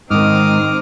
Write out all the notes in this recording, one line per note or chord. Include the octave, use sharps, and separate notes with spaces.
G#2 D#3 C4 D#4 D6 D#6 F6